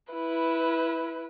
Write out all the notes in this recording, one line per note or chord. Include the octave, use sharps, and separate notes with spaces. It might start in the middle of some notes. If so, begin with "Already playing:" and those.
E4 B4